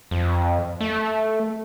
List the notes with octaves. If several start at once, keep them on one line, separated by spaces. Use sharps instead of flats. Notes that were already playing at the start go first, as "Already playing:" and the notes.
F2
A3